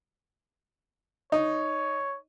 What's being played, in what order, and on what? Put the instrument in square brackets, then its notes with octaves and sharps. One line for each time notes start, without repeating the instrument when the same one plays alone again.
[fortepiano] D#4 [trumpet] C#5